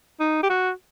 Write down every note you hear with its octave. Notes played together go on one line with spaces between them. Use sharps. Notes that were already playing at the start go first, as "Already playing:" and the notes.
D#4
G4
F#4